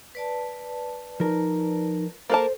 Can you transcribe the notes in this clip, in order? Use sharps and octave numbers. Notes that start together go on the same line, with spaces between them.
B4 D5 A5
F3 D#4 A#4
A#3 A4 A#4 C5 A5